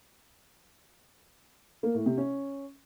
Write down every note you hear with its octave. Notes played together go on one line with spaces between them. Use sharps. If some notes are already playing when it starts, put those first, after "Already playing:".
A#3
A2
C3
C#4